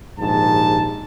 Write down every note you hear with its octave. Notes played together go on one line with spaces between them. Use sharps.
A#1 D#2 G#2 A5